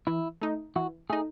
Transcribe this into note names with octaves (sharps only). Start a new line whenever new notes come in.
E3 E4
A3 D#4
E3 F#4
A3 D#4 G#4